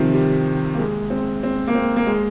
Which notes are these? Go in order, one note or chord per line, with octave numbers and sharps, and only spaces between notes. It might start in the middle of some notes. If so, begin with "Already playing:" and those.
Already playing: C3 D#3 F3
G3
A#3
G#3
C4
C4
A#3
C4
A#3
G#3